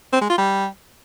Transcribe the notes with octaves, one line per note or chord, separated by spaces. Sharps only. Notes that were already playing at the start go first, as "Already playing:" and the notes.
C4
G#3
F4
G3